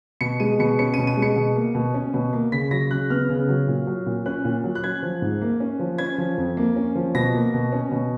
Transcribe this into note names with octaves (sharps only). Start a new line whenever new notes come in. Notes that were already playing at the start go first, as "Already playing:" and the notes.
B2 C#7
G#3 D#7
B2 C#7
C#4 C#7
B2 D#7
D#7
G#3
C#7
B2
A#3
B2
C#4
B2
A#3
C#3 B6
F#3 A#6
C#3 F#6
B3 F6
C#3
F#3
A#2
F#3
A#2
C#4 F#6
A#2
F#3
F#6
C#4 G#6
F3
G#2
A#3
C#4
F3
C#4 G#6
F3
F2
A#3
C#4
F3
B2 A#6
A#3
B2
C#4
B2